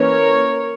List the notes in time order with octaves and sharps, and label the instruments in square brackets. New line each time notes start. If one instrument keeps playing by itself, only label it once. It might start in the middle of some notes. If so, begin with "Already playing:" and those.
Already playing: [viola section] E3 A#3 C#4 A#4 C#5